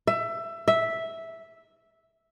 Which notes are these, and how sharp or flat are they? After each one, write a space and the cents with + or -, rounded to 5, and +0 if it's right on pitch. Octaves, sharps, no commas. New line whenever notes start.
E5 +20
E5 -5